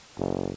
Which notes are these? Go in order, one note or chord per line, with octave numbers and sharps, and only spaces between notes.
F#1